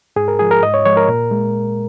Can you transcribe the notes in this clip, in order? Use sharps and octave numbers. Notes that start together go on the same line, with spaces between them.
G#2 G#4
A#4
F3 G#3 G#4
A#4
G#2 D#5
C#5
F3 G#3 C#5
A#4
A#2
G#3